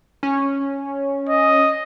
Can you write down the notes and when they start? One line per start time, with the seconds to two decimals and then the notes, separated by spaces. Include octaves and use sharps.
0.23 C#4
1.30 D#5